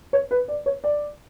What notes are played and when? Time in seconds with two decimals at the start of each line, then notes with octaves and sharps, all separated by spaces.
0.13 C#5
0.31 B4
0.48 D5
0.66 C#5
0.84 D5